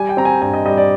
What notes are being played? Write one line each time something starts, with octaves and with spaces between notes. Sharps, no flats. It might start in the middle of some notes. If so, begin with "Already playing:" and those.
Already playing: G3 G#5
G5
C4 A#5
G#5
G2 G#5
D#5
G3 D#5
D5